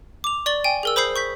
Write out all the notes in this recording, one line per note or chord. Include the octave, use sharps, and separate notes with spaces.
D6 F7
D5 C#6 A6 F#7 G7
G5 G#5
G#4 A#4 E6
C5 B5 D#6 G6 C7
C#6 G6 B6